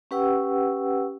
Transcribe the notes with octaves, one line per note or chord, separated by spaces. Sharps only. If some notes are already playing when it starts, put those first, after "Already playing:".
C#4 G4 B4 F#5 G5 E6